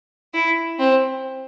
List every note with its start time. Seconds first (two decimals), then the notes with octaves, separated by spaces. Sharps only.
0.34 E4
0.79 C4